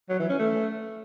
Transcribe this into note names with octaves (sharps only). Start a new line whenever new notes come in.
F#3
E3
C#4
A3